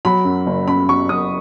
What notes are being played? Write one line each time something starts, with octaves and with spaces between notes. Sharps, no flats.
F#3 B5
F#2
F#1
C#3 B5
F#3 C#6
F#2 D#6